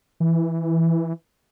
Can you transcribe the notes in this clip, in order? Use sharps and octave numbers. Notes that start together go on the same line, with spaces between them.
E3